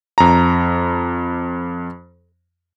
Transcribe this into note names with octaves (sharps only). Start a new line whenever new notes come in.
F2 A#5